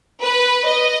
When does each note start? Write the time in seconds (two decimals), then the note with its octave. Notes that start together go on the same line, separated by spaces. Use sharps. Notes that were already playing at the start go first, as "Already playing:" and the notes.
0.22 B4
0.67 D#5